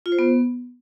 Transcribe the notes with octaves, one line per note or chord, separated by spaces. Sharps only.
F4
C5
B3